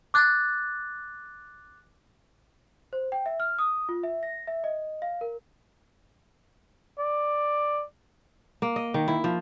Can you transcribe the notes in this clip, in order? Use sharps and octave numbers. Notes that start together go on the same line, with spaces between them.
D6 F#6 A6
C5
G5
E5
F6
D#6
F4
E5
A#6
E5
D#5
F5
A#4
D5
A#3
D#5
D#3
E4
F3